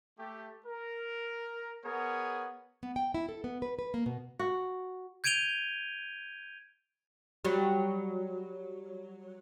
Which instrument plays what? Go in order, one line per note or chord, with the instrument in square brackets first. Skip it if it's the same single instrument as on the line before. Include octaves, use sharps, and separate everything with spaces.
[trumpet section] A3 G4
A#4
B3 G#4 A#4 C#5
[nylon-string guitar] B3
G5
E4
A4
B3
B4
B4
A#3
B2
[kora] F#4
[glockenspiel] G6 G#6 D7 D#7 F7 G7
[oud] F#3 G3